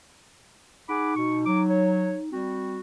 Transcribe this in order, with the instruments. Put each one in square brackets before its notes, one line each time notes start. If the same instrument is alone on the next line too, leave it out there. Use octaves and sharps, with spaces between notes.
[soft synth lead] D#4 [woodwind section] G#4 F#5 D6 [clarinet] B5
[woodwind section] B2 [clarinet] C#6
[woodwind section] F#3 [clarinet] D6
[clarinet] C#5
[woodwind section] G3 F#4 [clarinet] C4